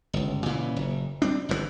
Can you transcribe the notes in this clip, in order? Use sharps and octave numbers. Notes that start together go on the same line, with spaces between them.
G1 C#2
A#2 C#3 E3
F#1
G3 C4 D4
G1 G2 A#2 E3